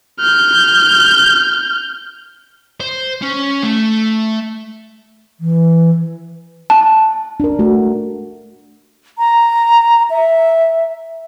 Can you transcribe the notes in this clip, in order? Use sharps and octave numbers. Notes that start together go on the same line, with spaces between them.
F6 G6
C5
C#4
A3
E3
A5
D4 A#4
A3 F#4
A#5
E5